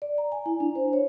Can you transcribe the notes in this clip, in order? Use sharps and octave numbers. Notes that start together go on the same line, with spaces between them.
D5
A#5
G#5
E4
D4
C5
C#5